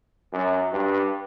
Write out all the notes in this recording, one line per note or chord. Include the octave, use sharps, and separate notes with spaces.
F#2
G2